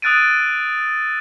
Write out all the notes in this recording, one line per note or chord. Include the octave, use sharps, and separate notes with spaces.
D#6 E6 F#6 A6 D7 D#7